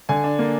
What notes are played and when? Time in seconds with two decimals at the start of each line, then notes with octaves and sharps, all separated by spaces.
0.09 D3 G#5
0.24 D4
0.39 A#3